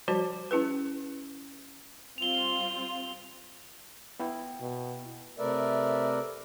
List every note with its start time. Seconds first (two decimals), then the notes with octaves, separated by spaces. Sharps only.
0.08 F3 G3 F#4 C5 A5
0.51 C#4 E4 G#4 B4
2.18 G3 C4 F4 F7 G7
4.20 B3 E4 G5
4.60 B2
5.39 C3 A3 A#4 B4 D5 E5